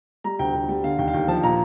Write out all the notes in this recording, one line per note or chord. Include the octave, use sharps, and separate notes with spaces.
G3 A#5
D2 G5
D2
G3
D3 F5
D#2 G5
F5
D#2 G5
F3 A5
A#2 A#5